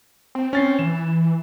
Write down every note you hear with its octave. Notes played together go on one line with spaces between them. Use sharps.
C4
C#4 A6 C7
E3 E7